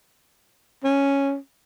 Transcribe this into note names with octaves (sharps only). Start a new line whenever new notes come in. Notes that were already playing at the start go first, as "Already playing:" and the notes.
C#4